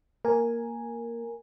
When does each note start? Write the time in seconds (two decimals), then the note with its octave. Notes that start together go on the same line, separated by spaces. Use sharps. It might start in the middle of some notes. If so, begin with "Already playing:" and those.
0.25 A#3 A#4 G#5